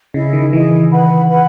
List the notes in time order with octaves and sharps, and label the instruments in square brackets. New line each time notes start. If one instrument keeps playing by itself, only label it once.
[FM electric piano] C#3 [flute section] E4 G#4 D#5
[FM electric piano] D#3
[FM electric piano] E3 [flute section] E4 G#4 D#5
[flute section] B4 F#5 B5
B4 F#5 B5